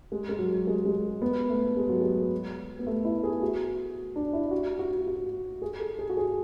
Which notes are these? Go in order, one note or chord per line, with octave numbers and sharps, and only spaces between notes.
G#3
G#3
F#3
G#3
G#3
B3
A3
G#3
F#3
G#3
B3
A3
E4
G#4
F#4
D4
E4
F#4
F#4
F#4
G#4
A4
G#4
F#4
G#4